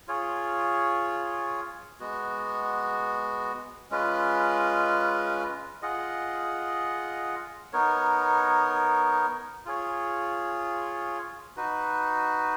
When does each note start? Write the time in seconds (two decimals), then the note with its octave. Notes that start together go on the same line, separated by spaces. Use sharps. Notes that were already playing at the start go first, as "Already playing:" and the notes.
0.08 F4 G#4 C#5
2.00 G#3 B3 F#4
3.91 G#3 C#4 F4 B4
5.82 F4 G#4 D#5 F#5
7.73 B3 D#4 A#4 C#5
9.65 F4 G#4 C#5
11.56 D#4 F#4 B4